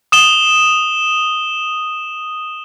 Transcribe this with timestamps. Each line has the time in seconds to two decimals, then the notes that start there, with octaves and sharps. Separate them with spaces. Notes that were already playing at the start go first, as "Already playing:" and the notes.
0.12 D#6 E7 G7